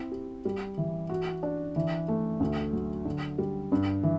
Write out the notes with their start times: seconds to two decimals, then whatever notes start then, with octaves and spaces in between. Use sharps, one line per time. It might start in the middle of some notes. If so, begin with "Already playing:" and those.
Already playing: C4 E4
0.11 G4
0.45 G3
0.77 E3
1.09 F#4
1.43 D4
1.76 E3
2.08 A3
2.40 D2
2.73 F#3
3.05 D3
3.38 G3
3.72 G2
4.03 E3